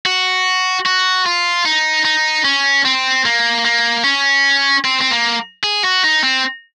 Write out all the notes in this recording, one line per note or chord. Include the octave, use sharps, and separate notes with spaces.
F#4
F#4
F4
D#4
D#4
C#4
C4
A#3
A#3
C#4
C4
C4
A#3
G#4
F#4
D#4
C4